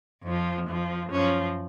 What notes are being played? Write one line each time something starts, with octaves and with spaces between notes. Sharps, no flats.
F2 F3
F2 F3
F#2 F3 C#4